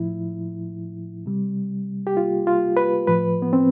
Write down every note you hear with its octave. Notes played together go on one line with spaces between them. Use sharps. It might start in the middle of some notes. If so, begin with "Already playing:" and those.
Already playing: A2 F3 E4
C3 G3
G4
F4
F4
B4
A2 F3 B4
B3
C4